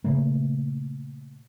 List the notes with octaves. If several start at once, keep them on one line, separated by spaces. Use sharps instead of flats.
A#2 C#3 A3 A#3